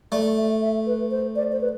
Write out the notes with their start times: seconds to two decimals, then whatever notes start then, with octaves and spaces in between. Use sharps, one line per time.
0.12 A3 D5
0.38 E5
0.61 E5
0.87 B4
1.11 C5
1.36 D5
1.52 C5
1.61 B4